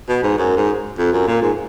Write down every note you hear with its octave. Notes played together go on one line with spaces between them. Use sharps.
B2
G#2
F#2
G#2
F2
F#2
A#2
G#2